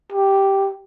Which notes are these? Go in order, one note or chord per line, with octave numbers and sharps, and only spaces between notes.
G4